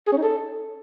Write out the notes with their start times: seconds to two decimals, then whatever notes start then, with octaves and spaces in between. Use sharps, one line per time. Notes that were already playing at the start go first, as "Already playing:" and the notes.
0.07 G#4
0.12 C#4
0.18 D#4
0.23 A4